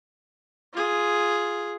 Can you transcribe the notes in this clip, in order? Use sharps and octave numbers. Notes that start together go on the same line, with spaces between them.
F4 G#4